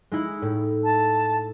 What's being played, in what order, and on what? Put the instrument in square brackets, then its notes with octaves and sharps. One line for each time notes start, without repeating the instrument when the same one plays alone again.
[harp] G#3 D#4 E4
A2
[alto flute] A5